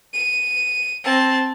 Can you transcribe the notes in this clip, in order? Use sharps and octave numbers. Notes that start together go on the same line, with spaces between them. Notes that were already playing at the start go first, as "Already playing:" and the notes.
D#7
C4 A5